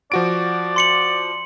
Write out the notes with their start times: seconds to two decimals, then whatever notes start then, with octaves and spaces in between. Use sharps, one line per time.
0.12 F3 F#4 D5 D7
0.76 C6 C#7 F#7